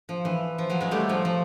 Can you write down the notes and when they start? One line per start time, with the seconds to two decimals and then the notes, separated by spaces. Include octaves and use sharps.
0.09 F3
0.25 E3
0.58 F3
0.70 E3 F#3
0.80 F#3 G#3
0.91 G3 A3
1.09 F3
1.25 F3